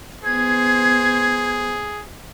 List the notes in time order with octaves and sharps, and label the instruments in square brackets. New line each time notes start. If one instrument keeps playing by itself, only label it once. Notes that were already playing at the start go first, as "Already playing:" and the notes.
[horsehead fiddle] B3 C5 [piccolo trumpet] G#4 [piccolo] G#6